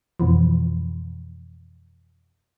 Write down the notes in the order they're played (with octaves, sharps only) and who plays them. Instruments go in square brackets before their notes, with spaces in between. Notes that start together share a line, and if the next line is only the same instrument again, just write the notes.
[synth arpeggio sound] F2 B2 E3 F3